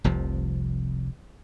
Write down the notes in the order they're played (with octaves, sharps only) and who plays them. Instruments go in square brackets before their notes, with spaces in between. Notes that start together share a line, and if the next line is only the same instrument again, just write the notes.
[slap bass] F1 C2 C3 F3